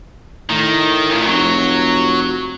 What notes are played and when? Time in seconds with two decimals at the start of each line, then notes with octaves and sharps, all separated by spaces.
0.50 A2 D#3
1.09 C#2 A#2
1.27 F1 F#3